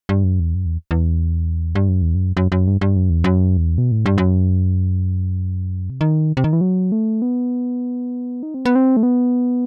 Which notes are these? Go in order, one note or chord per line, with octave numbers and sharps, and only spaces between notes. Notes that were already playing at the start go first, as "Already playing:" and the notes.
G2
F#2
E2
F#2
E2
E2
G2
F#2
E2
F#2
F#2
F#2
G2
G2
F#2
E2
F#2
E2
B2
A2
G2
F#2
C3
D#3
C3
D#3
E3
F#3
A3
B3
D#4
C4
B3
C4
A3
B3